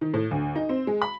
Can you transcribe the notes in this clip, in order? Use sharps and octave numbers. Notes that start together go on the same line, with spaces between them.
D#3
A2
D2
D#4
C4
G#3
B5